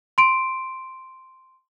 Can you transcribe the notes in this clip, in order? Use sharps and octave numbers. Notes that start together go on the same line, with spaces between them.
C6 D7